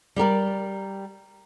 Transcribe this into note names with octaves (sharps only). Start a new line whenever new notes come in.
G3 G4 A#4 D5